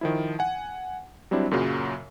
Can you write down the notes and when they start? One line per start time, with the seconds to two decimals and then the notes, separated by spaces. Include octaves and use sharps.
0.01 D#3 F3 E4
0.39 F#5 G#5
1.31 F#3 G3 C4 D4 E4
1.51 F#2 A#2 C#3 F#3